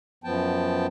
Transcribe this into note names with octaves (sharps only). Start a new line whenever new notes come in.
F#2 F3 B3 G5 A5